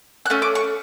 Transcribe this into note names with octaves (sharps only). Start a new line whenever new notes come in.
F#6
A3 C#4
D6
C#6